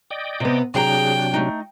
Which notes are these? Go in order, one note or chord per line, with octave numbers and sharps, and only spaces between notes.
D5 D#5 G5
C3 B3
C3 F#3 D4 G#4 F5 G5 A#5
A3 D#4